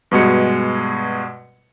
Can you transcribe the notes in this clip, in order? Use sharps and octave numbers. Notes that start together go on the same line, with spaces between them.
G2 B2 G#3 C#7